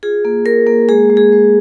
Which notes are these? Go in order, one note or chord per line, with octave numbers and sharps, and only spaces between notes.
F4 G#4
A#3
A#3 A#4
A#3
G#3 G#4
G#3
G#4
G#3